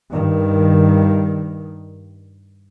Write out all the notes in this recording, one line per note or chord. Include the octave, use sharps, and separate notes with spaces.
G2 D#3